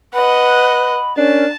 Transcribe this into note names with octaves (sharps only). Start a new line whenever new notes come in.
B4 D#5 F#5 B5
C#4 D4 A#4 A5